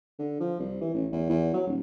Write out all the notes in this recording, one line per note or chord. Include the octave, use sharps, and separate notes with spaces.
D3
F3
C2
E3
A1
E2
E2
F#3
D#1